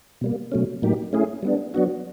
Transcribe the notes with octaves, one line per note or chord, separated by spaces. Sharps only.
B2 G3 A#3
B2 F#3 A3 C#4
A2 F#3 A#3 D#4 G4
A3 C#4 E4 G#4
G3 B3 D4
F#3 B3 D4 F#4